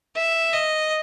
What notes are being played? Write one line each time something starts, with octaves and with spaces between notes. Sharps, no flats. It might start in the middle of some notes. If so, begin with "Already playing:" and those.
E5
D#5